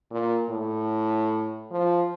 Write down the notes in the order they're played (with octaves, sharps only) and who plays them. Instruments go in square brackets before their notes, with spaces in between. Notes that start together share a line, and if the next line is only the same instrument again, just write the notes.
[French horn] A#2
A2
F3